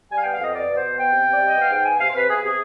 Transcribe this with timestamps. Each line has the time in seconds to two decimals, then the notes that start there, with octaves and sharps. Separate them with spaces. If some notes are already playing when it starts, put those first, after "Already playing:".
0.10 G3 G#5
0.17 F5
0.22 B3 G5
0.32 F5
0.39 F2 D#5
0.54 B3 D5
0.69 B2
0.76 C5
0.84 B2
0.97 B3 G5
1.13 C3
1.28 C3
1.33 D5
1.41 G3 D#5
1.57 B3 F5
1.70 G#2 G5
1.85 B3 G#5
2.00 C3 F5
2.09 C5
2.14 C3 B4
2.29 B3 G#4
2.43 C3 G#4